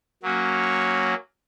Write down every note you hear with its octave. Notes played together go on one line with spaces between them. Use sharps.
F#3 A#3 C#4 F#4